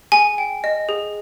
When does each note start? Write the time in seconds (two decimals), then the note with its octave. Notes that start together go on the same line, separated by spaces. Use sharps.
0.12 G#4 G#5
0.38 G5
0.64 D#5
0.89 G#4